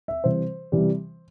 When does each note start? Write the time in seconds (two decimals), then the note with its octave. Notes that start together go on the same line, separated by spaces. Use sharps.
0.08 E5
0.24 C3 E3 G3 C5
0.72 C3 E3 G3